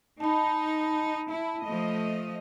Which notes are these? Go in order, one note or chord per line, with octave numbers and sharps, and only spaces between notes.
D#4 A5 B5
E4
F3 A3 D#5